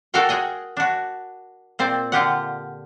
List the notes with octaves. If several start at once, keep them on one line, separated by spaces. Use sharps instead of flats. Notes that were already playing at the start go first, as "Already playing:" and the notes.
F#4 A4 A#4 D5 F5 G5
F#4 G#4 D#5 G5
D4 F#4
A#2 C4 C5 D5
D3 F4 G4 F#5